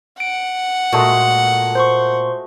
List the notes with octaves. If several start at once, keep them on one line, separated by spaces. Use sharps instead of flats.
F#5 D7
A#2 G#3 A3 F#4
C5 C6 C#6